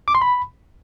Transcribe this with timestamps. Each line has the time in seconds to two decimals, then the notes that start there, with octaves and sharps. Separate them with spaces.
0.08 D6
0.15 C6
0.22 B5